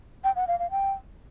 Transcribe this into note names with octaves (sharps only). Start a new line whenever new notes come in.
G5
F#5
F5
F5
G5